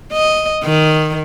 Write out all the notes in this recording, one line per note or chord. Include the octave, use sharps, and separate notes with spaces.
D#5
D#3